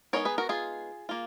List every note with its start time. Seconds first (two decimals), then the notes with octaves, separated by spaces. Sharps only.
0.13 G#3 B3 D#4 A#4 C#5
0.25 G#4 B4
0.38 F#4 A#4
0.49 F4 G#4
1.09 A#3 F4